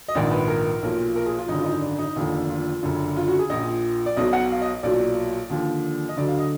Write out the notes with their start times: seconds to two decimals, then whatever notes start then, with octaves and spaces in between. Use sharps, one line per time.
0.08 D#5
0.15 A#1 G#2 D#3 D5
0.31 B4
0.48 A#4
0.82 B1 A#2 F3
1.16 A#4
1.26 G#4
1.38 F4
1.48 G#1 F#2 D3 D#4
1.59 F4
1.66 D#4
1.82 D4
1.98 D#4
2.16 F1 D#2 D3 F3
2.49 F4
2.83 F#1 F#2 D3
3.17 F4
3.28 F#4
3.39 G#4
3.49 A#1 A#2 F3 D#5
4.06 D5
4.16 B1 B2 F#3 D#5
4.33 F#5
4.50 F5
4.62 D#5
4.83 B1 A#2 F#3 D5
5.50 D#2 D3 F3
6.09 D#5
6.16 D2 D3 F#3 D5
6.28 F5
6.39 D#5